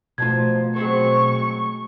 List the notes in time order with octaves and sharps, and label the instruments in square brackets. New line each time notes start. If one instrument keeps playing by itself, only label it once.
[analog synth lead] B2 [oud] F3 F4 [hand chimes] A3 A5 G#6
[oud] F#3 G#3 C4 [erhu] C#6